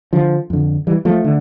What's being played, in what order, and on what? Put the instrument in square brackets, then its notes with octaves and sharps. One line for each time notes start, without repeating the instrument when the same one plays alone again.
[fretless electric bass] D3 F3
F2 D3
E3 G3
F3 A3
D3